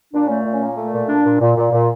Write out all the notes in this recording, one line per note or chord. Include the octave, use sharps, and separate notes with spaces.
A#2 D4
A3 C#4
A#2
C#4
A#2
A3
A#2
A#2 D4
A#2
A#2
A#2
A#2